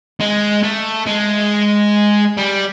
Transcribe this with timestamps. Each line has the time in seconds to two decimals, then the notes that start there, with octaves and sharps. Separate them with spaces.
0.20 G#3
0.63 A3
1.07 G#3
2.37 G3